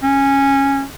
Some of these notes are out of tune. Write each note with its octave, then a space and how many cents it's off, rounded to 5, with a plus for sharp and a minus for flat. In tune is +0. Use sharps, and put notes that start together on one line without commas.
C#4 -10